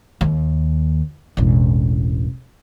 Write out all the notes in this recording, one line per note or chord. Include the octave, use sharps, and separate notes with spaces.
D#2
E1 A1